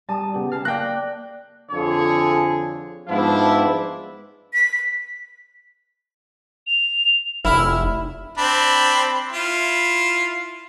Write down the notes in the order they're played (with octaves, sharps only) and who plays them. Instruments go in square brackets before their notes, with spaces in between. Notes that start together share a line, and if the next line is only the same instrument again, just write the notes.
[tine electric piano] G3 [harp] A5 D#6
[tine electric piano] C#3 B3 G4
[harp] A5 A6 C7 [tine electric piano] F6
[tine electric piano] A#3 [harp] D5 A#6 [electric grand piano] G5 F#6
[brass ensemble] F2 D3 F3 G#4 C#5
G#2 F3 B3 D4 E4
[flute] B6
[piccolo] F7
[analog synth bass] F1 [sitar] E4 [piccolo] F6
[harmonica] C4 D4 B5
E4 F4